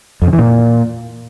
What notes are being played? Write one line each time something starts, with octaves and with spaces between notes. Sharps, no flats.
F2
C#3
E3
A#2